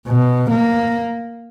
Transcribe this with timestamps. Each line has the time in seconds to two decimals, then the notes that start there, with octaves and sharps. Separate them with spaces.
0.08 B2
0.51 A#3